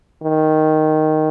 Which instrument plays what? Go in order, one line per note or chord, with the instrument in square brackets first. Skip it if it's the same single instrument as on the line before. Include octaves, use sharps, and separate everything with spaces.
[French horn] D#3